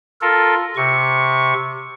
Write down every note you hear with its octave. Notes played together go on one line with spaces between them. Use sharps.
F4 A4 A#4
C3 C#6